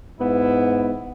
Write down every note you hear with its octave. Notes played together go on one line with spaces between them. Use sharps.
G#2 B3 E4